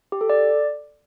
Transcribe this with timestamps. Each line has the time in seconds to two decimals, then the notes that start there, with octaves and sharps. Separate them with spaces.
0.12 G4
0.21 A4
0.29 D5